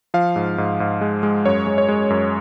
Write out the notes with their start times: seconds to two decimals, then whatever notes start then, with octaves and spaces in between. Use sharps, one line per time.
0.14 F3 F5
0.36 G#2
0.58 G#2
0.80 G#2
1.01 G#3
1.23 G#3
1.45 F#2 C#5
1.67 G#3
1.78 C#5
1.88 G#3
2.10 F#2